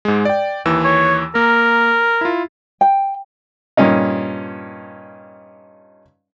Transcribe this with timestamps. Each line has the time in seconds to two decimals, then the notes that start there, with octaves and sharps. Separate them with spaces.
0.05 G#2 G#3
0.25 D5 G5
0.65 D#2 E3 E6
0.84 C#5
1.35 A#3 A#4
2.21 E4 F4
2.81 G5
3.77 G2 A#2 C#4 D#4